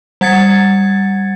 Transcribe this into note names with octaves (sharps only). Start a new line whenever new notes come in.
G3 F#5 G#6 A6 C#7